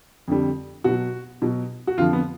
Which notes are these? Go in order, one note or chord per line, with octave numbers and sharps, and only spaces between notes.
F2 D3 G3
B2 F#3 F#4
B2 F#3
F#4
F2 D3 F3 F4
B3